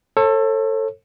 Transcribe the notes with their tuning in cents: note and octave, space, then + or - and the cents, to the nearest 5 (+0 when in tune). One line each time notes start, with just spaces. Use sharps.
A4 +20 C#5 -40